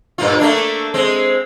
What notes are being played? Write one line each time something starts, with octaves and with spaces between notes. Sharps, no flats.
G2 A#2 F4
A3 A#3 D4
G#3 C4